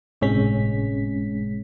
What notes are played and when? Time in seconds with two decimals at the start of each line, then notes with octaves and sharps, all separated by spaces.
0.21 G1 A2 C3 G#3 C#4 B6